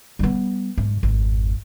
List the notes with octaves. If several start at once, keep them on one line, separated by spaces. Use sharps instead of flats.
G3 B3
G#2
G#1 F2